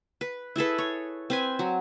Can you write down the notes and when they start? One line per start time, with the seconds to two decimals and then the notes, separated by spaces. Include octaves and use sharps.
0.21 B4
0.56 E4 G#4 A4 B4
0.78 C#5
1.30 C4 B4 G#5
1.59 F#3